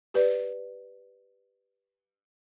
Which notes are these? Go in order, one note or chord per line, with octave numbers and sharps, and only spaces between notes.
G4 B4 D5